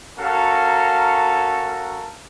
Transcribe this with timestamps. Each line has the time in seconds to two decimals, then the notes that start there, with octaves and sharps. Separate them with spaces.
0.19 C#4 F#4 A4 A#4 F5 A#5